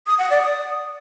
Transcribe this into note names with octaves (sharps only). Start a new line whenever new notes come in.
D#6
F#5
D5
D#6